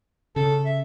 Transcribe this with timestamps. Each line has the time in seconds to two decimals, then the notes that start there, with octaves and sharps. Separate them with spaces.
0.36 C#3 A4
0.65 E5